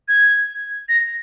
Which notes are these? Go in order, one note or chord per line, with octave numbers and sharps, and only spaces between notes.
G#6
A#6